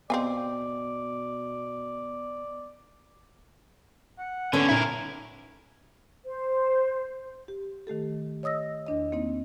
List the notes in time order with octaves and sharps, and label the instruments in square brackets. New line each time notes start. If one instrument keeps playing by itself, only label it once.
[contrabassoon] B2 [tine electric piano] B3 D#5 [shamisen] C4 F5 G#5 [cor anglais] D5
[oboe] F#5
[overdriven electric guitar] D3 [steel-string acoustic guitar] A3 B3 C#4 [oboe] G#5
[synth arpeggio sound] A#2 D#4 E5 [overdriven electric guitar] E4 A#4
[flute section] C5
[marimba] G4
D#3 A3 G4 A4
C#5 D#5 D#6 E6 A#6
E2 D4 D#5
A#3 C4 D#4